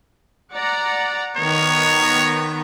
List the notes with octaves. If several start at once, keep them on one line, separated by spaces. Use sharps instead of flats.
D5 F#5 A#5
D#3 B3 C#5 A#5